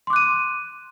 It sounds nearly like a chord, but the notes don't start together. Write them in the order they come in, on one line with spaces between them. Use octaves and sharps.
C6 D6 F#6 D#7